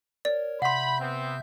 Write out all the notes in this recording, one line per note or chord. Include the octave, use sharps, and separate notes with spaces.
A#4 C#5 D5
C3 E5 F#5 B5 C6 G6
B3 C4